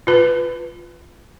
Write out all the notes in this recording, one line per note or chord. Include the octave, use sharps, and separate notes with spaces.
F4 B4